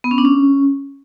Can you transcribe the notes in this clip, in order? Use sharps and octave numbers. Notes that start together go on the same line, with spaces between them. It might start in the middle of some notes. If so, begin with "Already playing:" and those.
B3
C#4
D4
C#4